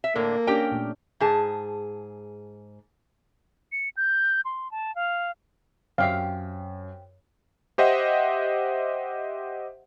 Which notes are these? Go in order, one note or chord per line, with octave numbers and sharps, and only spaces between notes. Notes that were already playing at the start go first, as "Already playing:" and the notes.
E5
A2 D3 A#3 D4 A4
C#4 D4 G4 A#4 G5
A#2 A3
G#2 G#4 A5
C#7
G6
C6
A5
F5
F#2 C4 G4 E5 F5
G4 C5 D#5 E5 F#5